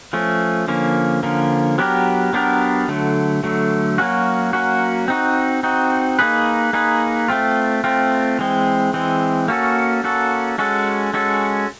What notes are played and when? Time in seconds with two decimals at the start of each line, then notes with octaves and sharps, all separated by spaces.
0.13 F3 A3 C#4
0.68 D3 F3 A#3 C#4
1.23 D3 F3 A#3 C#4
1.78 F#3 B3 D4 G4 A#4
2.33 F#3 B3 D4 G4 A#4
2.88 D3 F#3 A3
3.43 D3 F#3 A3
3.98 F#3 A#3 C#4 F#4
4.53 F#3 A#3 C#4 F#4
5.08 C4 D#4 F#4
5.63 C4 D#4 F#4
6.19 A#3 D#4 G#4 B4
6.73 A#3 D#4 G#4 B4
7.28 A3 C4 F4
7.84 A3 C4 F4
8.39 E3 G#3 C4
8.93 E3 G#3 C4
9.48 A#3 C#4 F#4 A4
10.04 A#3 C#4 F#4 A4
10.58 G#3 C#4 F#4 A4
11.14 G#3 C#4 F#4 A4